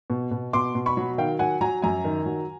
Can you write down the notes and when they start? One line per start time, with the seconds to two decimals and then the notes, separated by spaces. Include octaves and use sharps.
0.10 B2
0.31 B2
0.53 B2 C6 D6
0.75 B2
0.86 B5 C#6
0.97 F#3
1.18 D#3 F5 G5
1.39 F#3 F#5 G#5
1.61 F#3 G#5 A#5
1.82 F#2 G#5 A#5
2.04 D#3
2.26 F#3